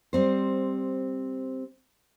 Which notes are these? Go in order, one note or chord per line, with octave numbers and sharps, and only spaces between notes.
G3 C4 C5